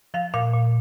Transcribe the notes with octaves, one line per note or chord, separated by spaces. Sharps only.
F3 F5
A#2 F5
A#2